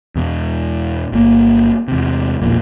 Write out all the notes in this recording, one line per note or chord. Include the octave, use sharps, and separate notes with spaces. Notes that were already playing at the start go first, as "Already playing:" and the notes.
E2 B2
G1 A#3
E2 C3
E1 A#1 A#2